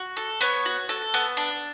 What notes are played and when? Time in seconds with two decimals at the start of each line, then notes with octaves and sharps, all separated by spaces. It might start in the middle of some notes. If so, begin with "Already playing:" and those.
Already playing: F#4
0.17 A4
0.41 B3 C#5
0.66 F#4
0.89 A4
1.14 B3
1.37 D4